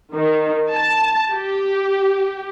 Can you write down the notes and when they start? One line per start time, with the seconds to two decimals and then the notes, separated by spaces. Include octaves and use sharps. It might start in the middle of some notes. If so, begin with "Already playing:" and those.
0.13 D#3
0.73 A5
1.32 G4